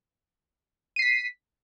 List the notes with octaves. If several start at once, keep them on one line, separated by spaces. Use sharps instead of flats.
B6 C7 D#7